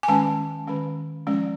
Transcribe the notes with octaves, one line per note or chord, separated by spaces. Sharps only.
G#5
D#3 G#3 C#4 A5
D#3 G#3 C#4
F3 G#3 C#4